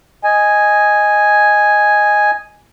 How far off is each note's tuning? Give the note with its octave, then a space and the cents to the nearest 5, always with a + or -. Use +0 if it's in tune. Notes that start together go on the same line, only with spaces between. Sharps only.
D#5 +0 G#5 +0